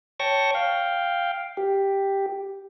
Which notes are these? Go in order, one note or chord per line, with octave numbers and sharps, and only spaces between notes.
C#5 G5 A5 C#6 A#6
F5 G5
G4